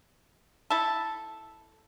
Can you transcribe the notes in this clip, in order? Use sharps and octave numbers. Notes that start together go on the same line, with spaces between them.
E4 A4